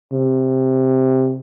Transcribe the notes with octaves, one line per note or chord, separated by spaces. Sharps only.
C3